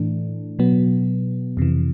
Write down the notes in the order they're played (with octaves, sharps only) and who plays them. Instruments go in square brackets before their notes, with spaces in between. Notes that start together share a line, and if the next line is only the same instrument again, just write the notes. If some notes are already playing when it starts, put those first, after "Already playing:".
Already playing: [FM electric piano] A2 E3 A3 D4
B2 F#3 B3
F2 C3 E3